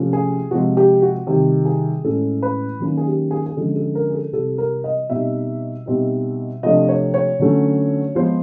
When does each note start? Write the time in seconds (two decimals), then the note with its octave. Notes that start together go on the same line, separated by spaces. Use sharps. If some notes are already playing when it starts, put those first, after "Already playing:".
Already playing: C3 F3 A3 C#4
0.13 G#4
0.51 C3 F3 G#3 C4 F#4
0.77 G4
1.02 F#4
1.27 C3 D#3 G3 G4
1.65 G#4
2.04 A2 E3 G#3 C#4 A4
2.43 B4
2.80 D#3 F#3 A#3 C#4
2.97 G#4
3.06 G4
3.31 G#4
3.46 G#4
3.57 D3 F3 G#3 C#4 A4
3.76 A4
3.95 A#4
4.10 G#4
4.14 A4
4.33 C3 E3 G3 A4
4.58 A#4
4.84 D#5
5.10 B2 G3 C4 D#4 E5
5.86 B2 G3 C4 D#4
6.63 C3 F3 A3 D4 D#5
6.89 C#5
7.14 C#5
7.39 D3 F#3 A3 C#4
8.15 F3 G#3 B3 C5